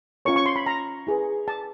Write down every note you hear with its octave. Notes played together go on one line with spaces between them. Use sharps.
C#4 F4 A#4 C#5 C#6
C#6
C6
B5
A#5
E4 G#4 B4
A5